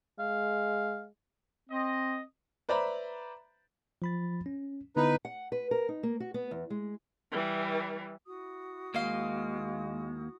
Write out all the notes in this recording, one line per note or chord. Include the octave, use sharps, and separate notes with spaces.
G#3 F5
C4 D#5
B4 C5 D5 E5 A#5 B5
F3 B5 A6
C#4
D3 B3 D#4 E4 B4
F#5
B4
A#4
D#4
A#3
F#4
B3
E2
G#3
E3 G3
E4 F#4 D#6
D#2 G#3 A#3 D#5 F5